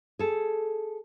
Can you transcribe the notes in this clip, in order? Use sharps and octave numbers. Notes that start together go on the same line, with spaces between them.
G#4 A4